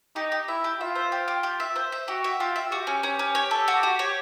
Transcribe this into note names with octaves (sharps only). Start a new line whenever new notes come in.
D#4 G4
G4
E4 E5
G4
F4 E5
C5
G4
G4
G4
E5
C5
E5
F#4 G4
E5
F4 G4
E5
F#4 G4
C#4
C#4
C#4
C#5
A4
F#4
F#4
C#5